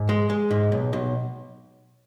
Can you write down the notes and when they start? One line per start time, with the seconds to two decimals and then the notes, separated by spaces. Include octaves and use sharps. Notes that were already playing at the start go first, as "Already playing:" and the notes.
Already playing: G#2
0.09 G#3
0.30 G#3
0.51 G#2
0.72 B1
0.93 B1